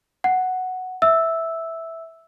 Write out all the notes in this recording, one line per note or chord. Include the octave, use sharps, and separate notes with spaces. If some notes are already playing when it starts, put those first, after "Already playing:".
F#5
E5 E6